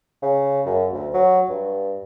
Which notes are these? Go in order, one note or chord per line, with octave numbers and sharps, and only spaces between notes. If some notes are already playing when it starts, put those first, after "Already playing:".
C#3
F#2
D2
F#3
G2